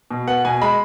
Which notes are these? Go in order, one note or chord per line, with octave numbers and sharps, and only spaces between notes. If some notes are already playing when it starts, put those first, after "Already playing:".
B2
B3 F#5
B2 G#5
G#3 B5